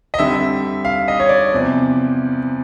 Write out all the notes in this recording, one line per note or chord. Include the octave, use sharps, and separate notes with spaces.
D#5
F2 D3 G3 E5
F5
D#5
C#5
D5
E2 C3 F3